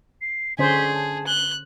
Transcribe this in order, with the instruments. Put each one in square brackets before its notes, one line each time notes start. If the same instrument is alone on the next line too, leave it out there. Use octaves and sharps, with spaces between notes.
[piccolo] C7
[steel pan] D3 C#4 C5 [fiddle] G#4 [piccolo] B6
[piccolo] A5
[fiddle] F#6 [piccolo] G7